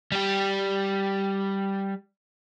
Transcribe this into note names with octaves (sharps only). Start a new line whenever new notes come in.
G3 G4